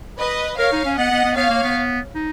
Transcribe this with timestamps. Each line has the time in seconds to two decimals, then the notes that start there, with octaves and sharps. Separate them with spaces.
0.19 B4 D#5
0.58 A#4 C#5 F5
0.72 D#4
0.85 C#4
0.97 B3 D#5 F#5
1.11 B3
1.24 B3
1.36 B3 C#5 F5
1.50 A#3
1.63 B3
2.15 D#4